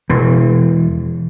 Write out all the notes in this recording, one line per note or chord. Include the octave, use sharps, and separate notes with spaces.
E1 E3